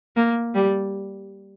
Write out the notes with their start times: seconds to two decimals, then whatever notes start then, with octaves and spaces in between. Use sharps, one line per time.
0.16 A#3
0.55 G3